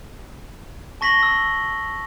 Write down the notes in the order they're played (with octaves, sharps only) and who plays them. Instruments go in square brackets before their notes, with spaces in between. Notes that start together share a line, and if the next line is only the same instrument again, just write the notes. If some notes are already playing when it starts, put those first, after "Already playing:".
[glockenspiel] A5 C#6 A#6 B6 F#7 G7
E6